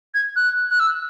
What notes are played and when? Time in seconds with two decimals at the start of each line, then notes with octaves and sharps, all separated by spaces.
0.15 G#6
0.36 F#6
0.71 F#6
0.80 E6